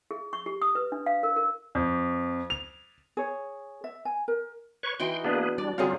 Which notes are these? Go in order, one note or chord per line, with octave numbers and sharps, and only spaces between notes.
G#4
C#6
G4
D#6
B4
D4
F5
A#4
A#4
F2
F7
G#4 C#5
E5
G#5
A#4
B4 C#5 C#6
E3 D#4 F#4 G5 C6
A#3 B3 D4 G#4 B4
G3 D4 D5
D3 F#3 G3 C4 F4 F#4 G#4 F5